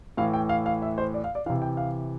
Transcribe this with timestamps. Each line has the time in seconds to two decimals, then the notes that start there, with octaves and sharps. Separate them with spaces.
0.17 A2 E3 F5
0.33 G5
0.49 F5
0.66 F5
0.82 E5
0.98 C5
1.14 D5
1.24 F5
1.35 D5
1.46 E3 F5
1.50 C3
1.62 G5
1.77 F5